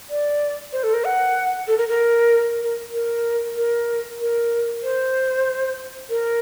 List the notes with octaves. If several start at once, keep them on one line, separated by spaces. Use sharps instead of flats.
D5
C5
A4
A#4
F#5
A4
A#4
A#4
A#4
A#4
A#4
A#4
C5
A#4